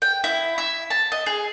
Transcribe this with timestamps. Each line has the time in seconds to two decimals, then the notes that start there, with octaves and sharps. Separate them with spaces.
0.02 G5
0.24 E4
0.58 E5
0.90 A5
1.12 D#5
1.26 G#4